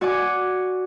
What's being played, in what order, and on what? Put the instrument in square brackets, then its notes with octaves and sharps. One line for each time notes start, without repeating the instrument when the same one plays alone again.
[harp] F#4 C#5 D5 F#5 G#5 D6